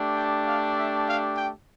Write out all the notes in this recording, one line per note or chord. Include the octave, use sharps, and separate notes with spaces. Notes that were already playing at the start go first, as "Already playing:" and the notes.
Already playing: A3 D4 G4
G5
F5
E5
F5
G5